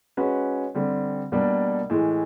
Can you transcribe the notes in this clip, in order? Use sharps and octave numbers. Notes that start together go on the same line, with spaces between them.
G#3 C#4 F#4 B4
D3 G3 C4
B2 G3 A#3 D4
A2 E3 G#3